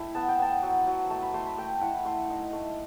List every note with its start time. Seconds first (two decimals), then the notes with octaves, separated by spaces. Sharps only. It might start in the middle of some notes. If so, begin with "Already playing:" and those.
Already playing: A3 E4 G5
0.15 B3 A5
0.28 G5
0.39 B3 A5
0.63 F#3
0.87 F#3
1.10 A3 A5
1.22 B5
1.34 A3 C6
1.46 B5
1.58 A3 G5
1.81 E4 F#5
2.05 A3 C6
2.30 D#4
2.53 A3